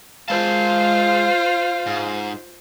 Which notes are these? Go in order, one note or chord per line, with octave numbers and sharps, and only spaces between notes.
G#3 F4 C5 F5 A5
G#2